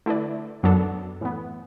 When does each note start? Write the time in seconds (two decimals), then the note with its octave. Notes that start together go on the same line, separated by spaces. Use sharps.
0.06 D3 A3 E4 B4 D5
0.63 F#2 F#3 B3 D4 A4
1.21 A2 E3 B3